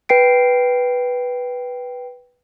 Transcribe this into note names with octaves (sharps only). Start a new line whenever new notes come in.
B4 G5 C7 D7